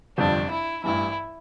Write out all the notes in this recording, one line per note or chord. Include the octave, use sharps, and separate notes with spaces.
G1 F2 C3 G3 D4
E4
A1 G2 E3 E4